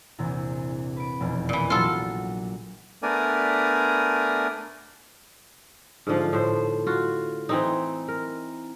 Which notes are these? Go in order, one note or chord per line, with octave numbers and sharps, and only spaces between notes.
A#1 E2 C3
B4 D7
F1 E2 B2
A#2 E3
A#1 F#3 F4 A4
A3 B3 D4 A#4 D5 G#5
G#2 D3 F3 F5
A2 C5
F4 F#4
E3 C4 D#4
A#4